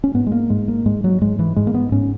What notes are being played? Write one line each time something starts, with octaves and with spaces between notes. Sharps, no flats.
C#4
G#2 B3
G#3
A#3
G#2 G#3
A#3
G#2 G#3
F#3
G#2 G#3
E3
G#2 G#3
A#3
B3
G#2 C#4